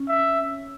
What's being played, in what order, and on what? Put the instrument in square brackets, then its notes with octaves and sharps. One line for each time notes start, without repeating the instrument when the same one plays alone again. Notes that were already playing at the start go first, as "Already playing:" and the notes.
Already playing: [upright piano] C#4
[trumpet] E5